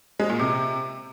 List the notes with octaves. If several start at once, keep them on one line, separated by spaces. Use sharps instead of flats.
G#3
A#2
C3